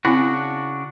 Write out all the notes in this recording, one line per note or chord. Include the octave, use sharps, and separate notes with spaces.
C#3 C4 D4 E4 F#4